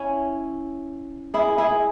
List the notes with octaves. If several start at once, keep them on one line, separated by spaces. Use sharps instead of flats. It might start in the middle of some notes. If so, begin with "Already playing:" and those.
Already playing: C#4 E4
E4 G#4
E4 G#4